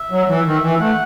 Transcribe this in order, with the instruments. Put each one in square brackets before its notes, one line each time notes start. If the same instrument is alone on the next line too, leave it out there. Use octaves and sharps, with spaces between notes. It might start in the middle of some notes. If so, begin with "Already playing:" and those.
Already playing: [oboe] E5
[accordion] F#3
E3
D#3
E3
[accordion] A3 [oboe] F#5